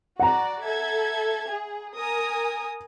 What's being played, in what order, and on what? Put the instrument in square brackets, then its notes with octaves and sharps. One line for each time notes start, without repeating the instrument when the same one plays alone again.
[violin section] F#4 D5 [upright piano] F#5 A#5
[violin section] A4 E5 G#6
G#4
A#4 G#5 D#6